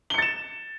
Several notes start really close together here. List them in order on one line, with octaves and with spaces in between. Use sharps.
G7 C#7 A6 E7